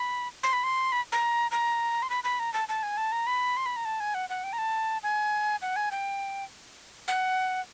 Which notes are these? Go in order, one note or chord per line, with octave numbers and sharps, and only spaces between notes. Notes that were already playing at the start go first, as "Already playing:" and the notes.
Already playing: B5
C6
B5
C6
B5
A#5
A#5
C6
B5
B5
A#5
A5
A5
G#5
A5
A#5
B5
C6
B5
A#5
A5
G#5
F#5
F#5
G5
A#5
A5
G#5
F#5
G#5
G5
F#5